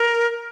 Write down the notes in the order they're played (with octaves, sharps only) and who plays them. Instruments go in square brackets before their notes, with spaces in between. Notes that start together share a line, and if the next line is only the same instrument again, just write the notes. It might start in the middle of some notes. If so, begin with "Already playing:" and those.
Already playing: [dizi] A#4